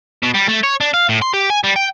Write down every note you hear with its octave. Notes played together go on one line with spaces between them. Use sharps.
B2
G3
A3
C#5
D4
F5
A2
C6
G4
G#5
G3
G5